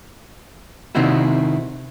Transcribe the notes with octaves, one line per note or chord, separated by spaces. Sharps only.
C3 D#3 C4 D#4 E4 F#4